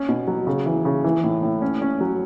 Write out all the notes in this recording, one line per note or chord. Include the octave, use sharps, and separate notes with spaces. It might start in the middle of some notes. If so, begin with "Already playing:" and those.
Already playing: C#4
B2
F#3
C#3
E3
C#3
E3
A2
A2
C#4
C#4
F#3